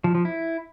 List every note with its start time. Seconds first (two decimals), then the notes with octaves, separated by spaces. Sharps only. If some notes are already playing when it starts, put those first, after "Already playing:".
0.04 F3
0.15 F3
0.25 E4